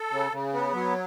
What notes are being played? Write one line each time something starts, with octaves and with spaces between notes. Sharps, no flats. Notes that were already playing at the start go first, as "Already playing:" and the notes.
Already playing: A4
C#3
C#3
B3
F#3